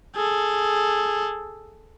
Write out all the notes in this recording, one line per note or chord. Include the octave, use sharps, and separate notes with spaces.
G#4 A4